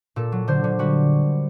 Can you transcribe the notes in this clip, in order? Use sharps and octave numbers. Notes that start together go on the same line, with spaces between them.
A#2 A4
F#3
D3 C5
D3
G3 F#4